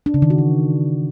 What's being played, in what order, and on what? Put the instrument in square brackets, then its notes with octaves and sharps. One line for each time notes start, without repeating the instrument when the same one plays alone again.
[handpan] D4
C#3
D#3
F#4
E3